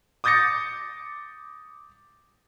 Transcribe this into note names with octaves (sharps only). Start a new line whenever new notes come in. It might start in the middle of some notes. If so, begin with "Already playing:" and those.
D6 D#6 G6 A6 A#6 C#7